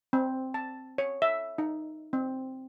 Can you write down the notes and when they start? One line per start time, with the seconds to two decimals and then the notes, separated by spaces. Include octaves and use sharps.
0.13 C4
0.54 A5
0.98 C#5
1.22 E5
1.58 D#4
2.13 C4